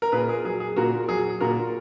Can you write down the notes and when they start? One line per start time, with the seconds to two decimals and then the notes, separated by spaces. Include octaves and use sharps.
0.02 A#4
0.12 A#2 G#4 B4
0.29 G#4
0.45 F#3 G#4
0.60 G#4
0.76 A#2 F#4 A#4
1.09 F#3 G#4
1.41 A#2 F#4 A#4